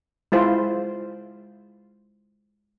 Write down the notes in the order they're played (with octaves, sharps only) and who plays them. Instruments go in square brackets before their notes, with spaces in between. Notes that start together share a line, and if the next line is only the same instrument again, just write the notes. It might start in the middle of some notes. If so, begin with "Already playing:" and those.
[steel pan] G#3 E4 F4 C5